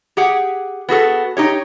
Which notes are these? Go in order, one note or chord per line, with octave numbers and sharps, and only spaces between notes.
G4 G#4 F#5
B3 F#4 G#4 A4
D#4 G4 C#5